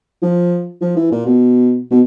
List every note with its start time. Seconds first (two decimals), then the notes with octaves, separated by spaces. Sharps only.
0.22 F3
0.82 F3
0.97 E3
1.12 A#2
1.26 B2
1.91 B2